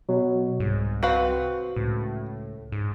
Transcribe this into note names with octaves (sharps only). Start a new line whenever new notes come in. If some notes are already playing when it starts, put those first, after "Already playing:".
B2 F#3
C2 G#2
C4 F#4 B4 F5
C#2 A2
G#2